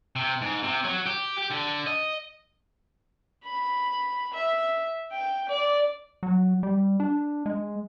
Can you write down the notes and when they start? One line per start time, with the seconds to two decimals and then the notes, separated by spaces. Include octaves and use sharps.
0.16 C3
0.41 G#2
0.63 C3
0.84 F#3
1.06 G4
1.38 G4
1.51 D3
1.87 D#5
3.44 B5
4.33 E5
5.12 G5
5.49 D5
6.23 F#3
6.63 G3
7.00 D4
7.46 G#3